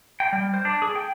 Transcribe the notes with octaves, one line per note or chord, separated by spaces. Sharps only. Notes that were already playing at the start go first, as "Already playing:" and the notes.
G5
G3
C5
D4
G#4
G5